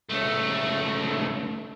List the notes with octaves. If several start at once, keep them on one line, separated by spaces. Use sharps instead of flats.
C#2 A3